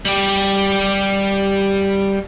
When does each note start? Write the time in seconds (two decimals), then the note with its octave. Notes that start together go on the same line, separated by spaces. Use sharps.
0.05 G3 G4